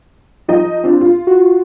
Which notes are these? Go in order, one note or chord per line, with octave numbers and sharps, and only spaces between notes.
F3 D#4 D#5
C4 D4 F4
F4
F#4